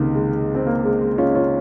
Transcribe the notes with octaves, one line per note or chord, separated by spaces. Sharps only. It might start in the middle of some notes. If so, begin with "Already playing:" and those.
Already playing: C#2 C3 D#3 A#3
G#3
C4
A#3
G#3
G#3
C#4 F4
C#4 F4